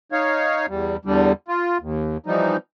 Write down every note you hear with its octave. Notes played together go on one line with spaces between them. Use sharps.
D#4 C#5 F5
E2 G3
E2 D3 G3
F4
D#2
E3 F3 G3 D#4